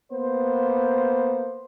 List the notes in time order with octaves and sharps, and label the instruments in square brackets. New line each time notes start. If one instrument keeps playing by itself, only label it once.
[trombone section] A#3 B3 C5